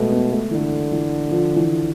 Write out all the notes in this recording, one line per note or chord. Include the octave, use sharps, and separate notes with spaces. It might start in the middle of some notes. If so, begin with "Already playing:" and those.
Already playing: B2 G#3 A3
B3
A3
D3 E3
E3
F3
E3